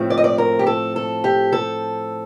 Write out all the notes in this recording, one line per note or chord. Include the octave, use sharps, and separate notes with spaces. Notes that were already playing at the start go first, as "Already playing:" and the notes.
Already playing: A2 F3 A3 C4
D5
D#5
D5
A#4
G4
A4
A4
G4
A4